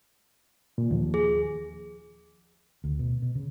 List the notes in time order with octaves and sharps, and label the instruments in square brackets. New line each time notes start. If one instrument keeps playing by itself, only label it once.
[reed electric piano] A#2
D#2 F3
[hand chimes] G#4
[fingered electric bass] D2
B2
B2
C#3